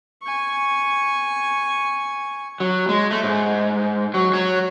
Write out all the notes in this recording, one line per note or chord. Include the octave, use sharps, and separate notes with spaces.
G#5 C#6
F#3
G#3
A3
G#2
F#3
F#3